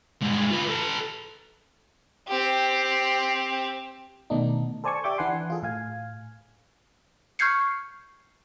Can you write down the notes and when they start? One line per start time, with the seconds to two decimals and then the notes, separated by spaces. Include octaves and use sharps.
0.21 G2 G#3
0.51 F4 B4
0.69 A4 B4
2.28 C4 G4
4.30 B2 D#3 A3 B3 D4 D#4
4.84 A4 C5 D5 G#5 A5 C#6
5.04 G4 D5 E5 D6 G6
5.18 E3 D4 B4 F#5 G#5 C6
5.50 F4 G#4 A4
5.63 A2 F5 G#5
7.39 C#6 F6 G6 G#6 C7 C#7